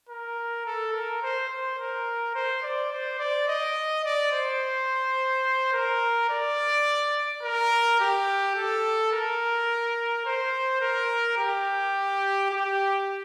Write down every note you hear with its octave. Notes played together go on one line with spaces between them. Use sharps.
A#4
A4
A#4
C5
C5
A#4
C5
D5
C5
D5
D#5
D5
C5
A#4
D5
A#4
G4
A4
A#4
C5
A#4
G4
G4